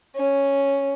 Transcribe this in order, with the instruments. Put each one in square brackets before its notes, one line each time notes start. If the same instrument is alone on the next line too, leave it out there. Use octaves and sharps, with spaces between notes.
[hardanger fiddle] C#4